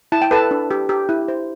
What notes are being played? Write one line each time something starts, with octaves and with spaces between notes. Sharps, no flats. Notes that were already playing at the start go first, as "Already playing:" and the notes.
E4 A5
G5
A4 B4 A5
D4
G4
G4
E4
C5